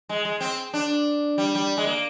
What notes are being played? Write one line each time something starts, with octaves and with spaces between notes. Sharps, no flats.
G#3
G#3
C4
D4
G3
G3
G#3
A#3